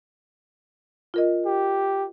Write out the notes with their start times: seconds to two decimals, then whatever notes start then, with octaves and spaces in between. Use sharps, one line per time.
1.14 F4 A#4 D#5
1.46 G4